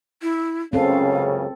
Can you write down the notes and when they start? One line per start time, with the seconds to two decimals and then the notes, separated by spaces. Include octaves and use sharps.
0.22 E4
0.73 C#2 F#2 C#3 C4 C#4 A4 F5